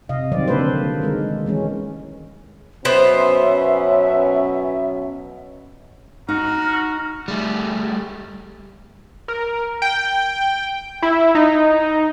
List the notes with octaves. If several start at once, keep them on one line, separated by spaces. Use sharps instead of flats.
C3 D#5 F5
D#3 F#3 G3 C4 D5
D3 A#3 D4 A4 B4 C5
D#3 G#3 A#4
E3 G#3 C#4
B2 F#3 B3 C#4 C5 E5
D#4 F#4 A#5 F6
G3 A3
A#4
G5
E4
D#4